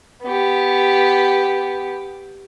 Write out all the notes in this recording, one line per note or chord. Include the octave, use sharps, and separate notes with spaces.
B3 G4